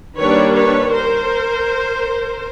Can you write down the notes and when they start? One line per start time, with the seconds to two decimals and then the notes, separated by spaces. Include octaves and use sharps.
0.18 D#3 G3 A#3 D4 B4 C#5
0.56 B4 C#5
0.92 A#4 C5